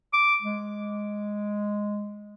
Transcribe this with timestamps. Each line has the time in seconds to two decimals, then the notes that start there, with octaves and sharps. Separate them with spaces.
0.13 D6
0.42 G#3